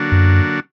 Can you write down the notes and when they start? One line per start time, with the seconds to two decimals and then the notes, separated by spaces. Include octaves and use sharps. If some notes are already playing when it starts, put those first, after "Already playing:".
Already playing: D3 F#3 A#3 D4 F#4
0.12 F#2